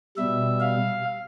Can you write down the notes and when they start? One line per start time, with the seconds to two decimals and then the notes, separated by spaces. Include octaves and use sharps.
0.17 B2 G3 E5
0.60 F5